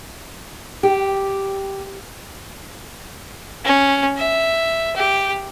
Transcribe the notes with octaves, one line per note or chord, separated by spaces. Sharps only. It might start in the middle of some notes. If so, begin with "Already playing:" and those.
G4
C#4
E5
G4